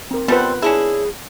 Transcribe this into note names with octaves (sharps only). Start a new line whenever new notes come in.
C4 A#4
G3 A3 B3 C4 F4 B4
C#4 D4 E4 G#4